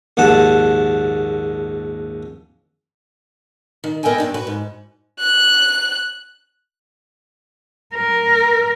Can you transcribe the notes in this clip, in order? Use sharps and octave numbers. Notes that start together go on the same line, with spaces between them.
A#1 D#2 G#2 F#5 A5
D#3
B3 A#4 D#5 E5 G5 G#5
G2 B2 D4
F#4 B4
G#2
F#6
A#4